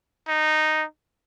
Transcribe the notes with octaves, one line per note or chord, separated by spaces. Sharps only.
D#4